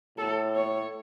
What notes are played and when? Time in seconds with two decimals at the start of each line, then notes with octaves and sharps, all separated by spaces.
0.18 A2 A4
0.56 C#5